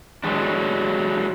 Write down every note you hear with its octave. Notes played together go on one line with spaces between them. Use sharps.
F#3 G#3 D4